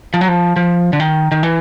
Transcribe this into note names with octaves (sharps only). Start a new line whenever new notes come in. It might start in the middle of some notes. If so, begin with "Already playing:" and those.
F3
F#3
F3
F3
D3
D#3
D#3
E3